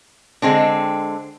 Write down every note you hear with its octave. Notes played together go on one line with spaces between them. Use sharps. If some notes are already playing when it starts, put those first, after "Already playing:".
D3 G#3 C4 D4